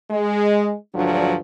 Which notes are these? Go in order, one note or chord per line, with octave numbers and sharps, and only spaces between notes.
G#3
D2 G2 F3 F#3 D4